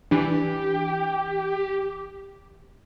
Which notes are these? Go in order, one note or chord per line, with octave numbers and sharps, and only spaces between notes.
E3 D4 G4